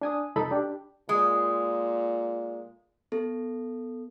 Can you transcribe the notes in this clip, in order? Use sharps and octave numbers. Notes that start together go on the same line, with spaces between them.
D4 G#5 D#6
C2 F2 D#4 A4 B5
D4 G4
A#2 G#3
B3 A4